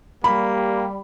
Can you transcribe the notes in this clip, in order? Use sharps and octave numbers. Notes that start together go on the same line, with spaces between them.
G3 A#3 B5